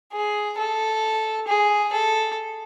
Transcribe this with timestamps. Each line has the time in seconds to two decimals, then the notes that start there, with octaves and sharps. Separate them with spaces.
0.13 G#4
0.57 A4
1.48 G#4
1.93 A4